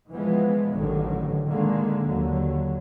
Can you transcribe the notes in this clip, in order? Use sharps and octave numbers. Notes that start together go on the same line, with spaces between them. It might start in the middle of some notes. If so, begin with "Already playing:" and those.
E3 F3 G#3 B3
A1 D3 D#3 F#3
D3 D#3 G#3 A#3
D#2 D3 F#3